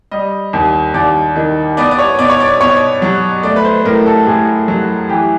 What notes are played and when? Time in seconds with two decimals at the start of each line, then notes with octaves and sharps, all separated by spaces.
0.11 G3 D#5
0.53 D#2
0.94 D#2 D5
1.36 D#3
1.77 B3 D5
1.91 D5
1.99 C#5
2.19 B2 D5
2.30 C#5
2.40 D5
2.61 B2 C#5
3.02 F#3
3.43 A3 D5
3.56 B4
3.65 C5
3.85 A2 A#4
4.06 A4
4.26 A2 G#4
4.68 F#3
5.09 E3 G4